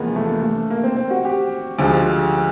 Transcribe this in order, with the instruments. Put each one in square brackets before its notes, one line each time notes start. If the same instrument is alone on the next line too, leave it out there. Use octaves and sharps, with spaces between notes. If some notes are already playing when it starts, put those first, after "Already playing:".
Already playing: [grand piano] E2 C3 F3 G#3 B3 [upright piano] A#3
[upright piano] A3
A3
A#3
C4
C4
F#4
G4
[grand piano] D2 D3 F3 G#3